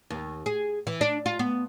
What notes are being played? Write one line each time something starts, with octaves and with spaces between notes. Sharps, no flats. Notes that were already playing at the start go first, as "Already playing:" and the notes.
D#2
G#4
E3
D4
F4
B3